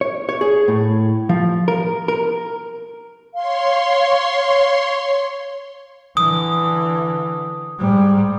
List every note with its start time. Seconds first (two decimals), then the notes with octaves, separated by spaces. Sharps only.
0.01 C#5
0.29 C#5
0.41 G#4
0.68 A2
1.29 F3
1.68 A#4
2.08 A#4
3.34 C#5 F5 C6
6.17 D3 E3 D#6
7.79 G#2 G3